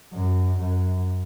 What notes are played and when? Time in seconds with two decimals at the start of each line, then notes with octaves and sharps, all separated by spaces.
0.13 F#2
0.59 F#2